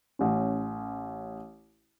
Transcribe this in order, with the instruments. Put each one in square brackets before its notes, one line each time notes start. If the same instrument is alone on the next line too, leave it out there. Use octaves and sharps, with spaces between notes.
[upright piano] A1 C#4